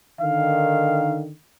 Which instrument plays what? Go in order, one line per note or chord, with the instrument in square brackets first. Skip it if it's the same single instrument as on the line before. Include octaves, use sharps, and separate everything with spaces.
[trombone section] D3 D#3 [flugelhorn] F5